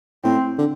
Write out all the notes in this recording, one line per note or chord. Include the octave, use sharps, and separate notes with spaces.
A2 C4
D3